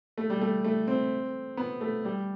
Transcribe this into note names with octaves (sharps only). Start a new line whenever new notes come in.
A3
G3
A3
A3
C4
B3
A3
G3